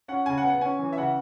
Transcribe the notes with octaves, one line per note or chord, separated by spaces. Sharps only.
C#4 F#5
C#3 G#5
F#5
B3
F#5
C#4 G#5
E3
E5
C#3 F#5